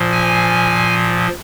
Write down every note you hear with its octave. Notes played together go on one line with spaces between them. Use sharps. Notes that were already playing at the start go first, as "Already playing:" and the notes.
Already playing: A#2 F3
G#5